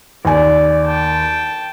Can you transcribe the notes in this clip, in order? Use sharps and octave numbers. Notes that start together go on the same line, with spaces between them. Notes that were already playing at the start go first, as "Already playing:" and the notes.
D#2 D5 G#5
G5 A5